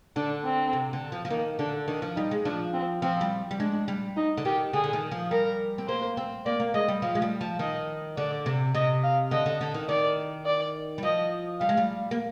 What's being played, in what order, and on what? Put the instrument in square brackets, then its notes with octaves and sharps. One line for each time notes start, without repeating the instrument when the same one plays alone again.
[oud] D3 [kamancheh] D4
[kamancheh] C4
[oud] C3
D3
F3
F3
[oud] D#3 [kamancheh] A#3
[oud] D3 [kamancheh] D4
[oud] D#3 [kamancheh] D4
[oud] F3
[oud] G3 [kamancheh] D#4
[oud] G#3
[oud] F3 [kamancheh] D4
[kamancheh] C4
[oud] F3 [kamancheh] C4
[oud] G3
G3
[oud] G#3 [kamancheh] D4
[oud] G3
[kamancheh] D#4
[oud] D3
[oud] D#3 [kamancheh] G4
[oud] D3 [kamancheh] G#4
[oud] D3
D#3
F3
[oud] G3 [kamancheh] A#4
[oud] C4
[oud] A#3 [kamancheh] C5
[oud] C4
[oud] A#3 [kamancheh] D5
[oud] A#3
[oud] G#3 [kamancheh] D#5
[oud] G3
[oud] F3 [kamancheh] F5
[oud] G#3
G3
F3
[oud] D#3 [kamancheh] D#5
[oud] D3 [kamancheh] D5
[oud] C3
[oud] C3 [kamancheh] D#5
[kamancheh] F5
[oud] D3 [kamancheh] D#5
[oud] D3
D3
D#3
[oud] D#3 [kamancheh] D5
[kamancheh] D5
[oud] G3
[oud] F3 [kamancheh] D#5
[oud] G3 [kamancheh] F5
[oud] G#3
G3
A#3